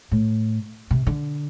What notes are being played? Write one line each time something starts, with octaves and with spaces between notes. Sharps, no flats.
A2
C3
D3